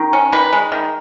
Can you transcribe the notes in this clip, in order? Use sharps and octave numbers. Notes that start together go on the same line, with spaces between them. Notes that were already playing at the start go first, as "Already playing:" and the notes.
Already playing: D#3
C#4
D#3 B4
G#3
D#3